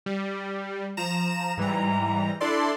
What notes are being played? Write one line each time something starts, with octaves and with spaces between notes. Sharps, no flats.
G3
F3 A#5 E7
G#2 E3 G3 A#5
D4 E4 A4 D5 C6